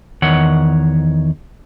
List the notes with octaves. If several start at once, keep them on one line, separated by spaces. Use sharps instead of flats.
E2 D#3 C#5 F#5